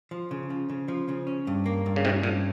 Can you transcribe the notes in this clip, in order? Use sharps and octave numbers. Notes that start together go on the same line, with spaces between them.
F3
C#3
F3
C#3
F3
C#3
C#4
G2
A#3
G2
C#3
G#2 C3 C#4
G2 A#2